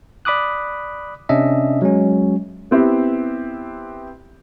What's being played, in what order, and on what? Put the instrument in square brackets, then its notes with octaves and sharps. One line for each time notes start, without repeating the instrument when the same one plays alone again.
[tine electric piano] D5 B5 D6 D#6 F#6
C3 C#4 D4 D#5 E5
F#3 G#3 C#4
[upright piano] B3 C4 E4 G4